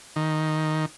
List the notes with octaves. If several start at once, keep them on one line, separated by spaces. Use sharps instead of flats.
D#3